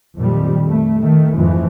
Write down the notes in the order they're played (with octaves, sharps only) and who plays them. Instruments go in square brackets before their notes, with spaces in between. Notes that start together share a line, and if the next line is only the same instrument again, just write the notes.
[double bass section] F2 A#2 D#3 G3
A3
D#3 A3
F2 G#2 E3 F3